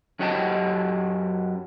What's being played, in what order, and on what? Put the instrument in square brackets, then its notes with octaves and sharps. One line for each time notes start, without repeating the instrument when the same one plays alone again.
[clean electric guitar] F#2 C#4 F#4 G4 D#5 A5